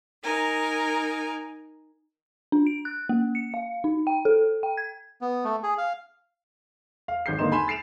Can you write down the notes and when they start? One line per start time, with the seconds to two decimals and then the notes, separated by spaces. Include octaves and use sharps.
0.23 D#4 A#4 G#5
2.52 D4
2.67 D7
2.85 F#6
3.09 A#3
3.35 C#7
3.54 F5
3.84 D#4
4.07 G5
4.25 A4
4.63 G5
4.77 G#6
5.21 B3
5.44 A3
5.63 G#4
5.78 F5
7.08 F5
7.26 G#1 G6 C7
7.39 G#1 D3 A#3 D#4 C6 E7
7.52 G#5 B5 C6 E7
7.68 A6 C7 D7 E7 F7